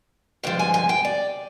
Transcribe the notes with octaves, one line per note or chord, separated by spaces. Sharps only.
G2 D3 F3 G#3 G5
G#5
G#5
G5
D5